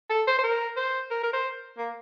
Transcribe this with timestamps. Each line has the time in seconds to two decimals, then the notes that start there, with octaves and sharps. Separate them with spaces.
0.10 A4
0.27 C5
0.39 C5
0.44 A#4
0.77 C5
1.11 A#4
1.23 A#4
1.33 C5
1.78 A#3